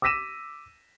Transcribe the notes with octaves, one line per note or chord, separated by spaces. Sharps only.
D6 E6 A#6 B6 D#7 E7